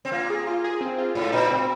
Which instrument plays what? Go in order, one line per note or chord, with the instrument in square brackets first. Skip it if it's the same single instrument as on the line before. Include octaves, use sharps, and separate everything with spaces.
[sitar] C4
[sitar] A#3 [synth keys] F4
[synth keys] G#4
F4
G#4
C4
F4
[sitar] G#2 [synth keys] F4
[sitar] A#2 [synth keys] D#4
[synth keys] C4